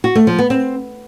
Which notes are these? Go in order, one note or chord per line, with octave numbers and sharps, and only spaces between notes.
F#4
A3
F3
B3
C4